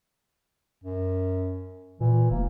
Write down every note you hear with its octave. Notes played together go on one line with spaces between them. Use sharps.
F#2
A#2 E3
F1 A#3